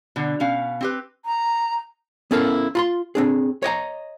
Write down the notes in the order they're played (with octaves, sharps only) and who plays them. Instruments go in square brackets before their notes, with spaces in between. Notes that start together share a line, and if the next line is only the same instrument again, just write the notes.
[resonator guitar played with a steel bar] B2 D3
B2 C#4 F5
C4 G4 B4
[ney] A#5
[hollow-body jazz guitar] B3 C#4 E4 A4 A#4 F5
F4 B5 C6
C4 D4 G#4
C#5 D#5 G5 A#5